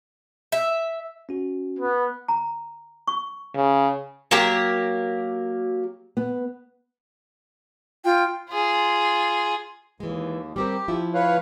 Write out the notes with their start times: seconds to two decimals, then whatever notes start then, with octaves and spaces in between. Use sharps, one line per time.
0.52 E5
1.29 C#4 F#4
1.78 B3
2.28 A#5
3.07 C#6
3.55 C#3
4.31 F#3 A#3 G4 A#4
6.17 B3
8.05 F4 G5
8.50 F4 G#4
10.00 D#2 E3 G#3
10.56 G3 C4 G4 A#4
10.88 F3 E4 F4
11.14 B4 C#5 F5